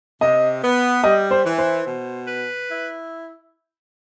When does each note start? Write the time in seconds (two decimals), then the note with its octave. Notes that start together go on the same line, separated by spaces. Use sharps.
0.21 C3 D#5
0.62 B3
1.04 G3 D#5
1.31 C5
1.45 E3
1.58 C5
1.86 B2
2.27 B4
2.68 E4